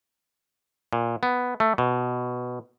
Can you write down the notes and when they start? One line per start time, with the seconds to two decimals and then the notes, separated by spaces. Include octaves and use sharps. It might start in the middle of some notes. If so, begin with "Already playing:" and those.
0.93 A#2
1.23 B3
1.60 A3
1.78 B2